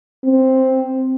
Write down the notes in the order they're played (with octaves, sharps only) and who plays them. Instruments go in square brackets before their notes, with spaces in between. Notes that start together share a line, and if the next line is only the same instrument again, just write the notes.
[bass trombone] C4